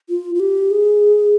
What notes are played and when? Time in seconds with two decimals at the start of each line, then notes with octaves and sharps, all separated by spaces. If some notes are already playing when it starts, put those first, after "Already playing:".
0.09 F4
0.35 F4
0.40 G4
0.71 G#4